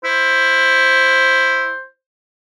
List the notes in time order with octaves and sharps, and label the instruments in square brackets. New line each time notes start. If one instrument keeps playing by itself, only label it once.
[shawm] E4 [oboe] C5